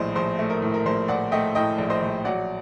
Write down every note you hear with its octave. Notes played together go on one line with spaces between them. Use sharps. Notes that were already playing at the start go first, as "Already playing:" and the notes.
Already playing: A#1 A2 A3 C5 D#5
A#1 C5
A3
A#4
A2
A#4
A#1 C5
A#1 D5 F#5
A3 D#5 G5
A2 D#5 G5
A#1
C5 D#5
A#1
F#3 D5 F#5